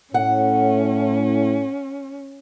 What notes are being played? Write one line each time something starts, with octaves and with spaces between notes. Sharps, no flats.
A2 C#4 F#5